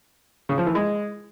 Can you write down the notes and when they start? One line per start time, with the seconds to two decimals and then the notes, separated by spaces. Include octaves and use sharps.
0.49 C#3
0.58 F3
0.66 E3
0.75 G#3